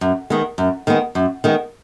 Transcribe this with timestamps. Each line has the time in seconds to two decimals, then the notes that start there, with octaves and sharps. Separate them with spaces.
0.01 F#2
0.30 D#3 G#3 B3
0.58 F#2
0.87 D#3 G#3 B3
1.15 F#2
1.44 D#3 G#3 B3